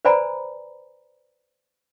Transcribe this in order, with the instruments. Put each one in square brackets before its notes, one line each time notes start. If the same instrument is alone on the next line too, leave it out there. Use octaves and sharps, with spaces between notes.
[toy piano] B4 C5 D5 G#5 A#5 B5